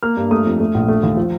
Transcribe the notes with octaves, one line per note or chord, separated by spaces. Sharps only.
A#3 F6
G2
A3 D#6
F2
A3
A#1
A3
D#2
F3